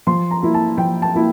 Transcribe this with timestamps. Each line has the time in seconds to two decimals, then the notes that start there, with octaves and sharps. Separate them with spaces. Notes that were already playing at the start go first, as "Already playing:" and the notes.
0.07 F3 C6
0.31 A#5
0.42 A#3 E4
0.54 A5
0.78 F3 G5
1.02 A5
1.14 A#3 E4